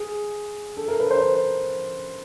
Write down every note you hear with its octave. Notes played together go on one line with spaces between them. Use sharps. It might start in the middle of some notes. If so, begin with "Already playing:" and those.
Already playing: G#4
A4
A#4
B4
C5